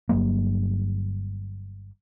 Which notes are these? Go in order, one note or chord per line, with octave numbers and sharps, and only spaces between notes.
G1 G2 F#3 A#3